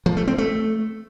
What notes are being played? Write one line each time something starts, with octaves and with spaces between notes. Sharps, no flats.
F3
A3
C4
A3